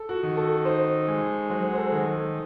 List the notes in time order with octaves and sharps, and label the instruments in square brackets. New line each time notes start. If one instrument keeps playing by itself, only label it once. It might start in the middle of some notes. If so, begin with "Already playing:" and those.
Already playing: [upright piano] A4
F#4
[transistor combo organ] D#3
[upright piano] A4
[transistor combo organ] D#4 [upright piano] C5
[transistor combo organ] G#3
[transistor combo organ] F#3 [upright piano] C5
[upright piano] C5
A4
[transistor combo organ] D#3
[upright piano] A4